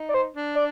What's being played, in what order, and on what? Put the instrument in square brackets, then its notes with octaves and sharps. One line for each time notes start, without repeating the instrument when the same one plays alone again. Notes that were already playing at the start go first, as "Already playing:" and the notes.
Already playing: [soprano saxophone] D#4
[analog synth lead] D5
C5
[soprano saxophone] D4
[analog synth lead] D5